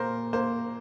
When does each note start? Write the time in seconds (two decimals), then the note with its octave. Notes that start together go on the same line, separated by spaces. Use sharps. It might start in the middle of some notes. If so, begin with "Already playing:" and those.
Already playing: A#2 A#3 A#4 C5
0.33 A#3 C5